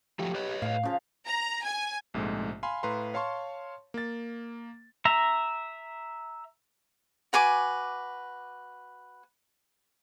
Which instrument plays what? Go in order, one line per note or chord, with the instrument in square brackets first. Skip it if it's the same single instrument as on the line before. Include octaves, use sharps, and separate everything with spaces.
[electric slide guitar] F3 F#3 A3 [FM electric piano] G4
[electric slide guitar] B4 C#5 D#5
[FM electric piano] A2 [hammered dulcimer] F5
[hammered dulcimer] C#3 F3
[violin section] A#5
G#5
[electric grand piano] A#1 G#2 C3 G#3 A3
F5 G#5 B5 C6
A2 B4 F5 A#5 C6
C#5 F5 A5 C6 C#6
A#3 A6
[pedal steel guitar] E5 A#5
[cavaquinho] F#4 B4 G#5 D6